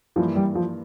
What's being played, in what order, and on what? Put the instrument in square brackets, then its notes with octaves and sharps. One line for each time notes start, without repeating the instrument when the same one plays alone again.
[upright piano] G2 E3 A#3 [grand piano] F3
[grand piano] G3
F3